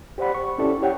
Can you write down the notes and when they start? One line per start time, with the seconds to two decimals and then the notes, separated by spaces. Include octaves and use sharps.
0.18 G4 C5 D5 F#5 B5
0.35 C#6
0.58 C#4 E4 G4 A4 D5
0.82 G4 C#5 F#5 G5